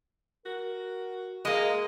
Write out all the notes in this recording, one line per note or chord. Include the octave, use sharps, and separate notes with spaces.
F#4 A#4
G#3 A#3 G#4 D#5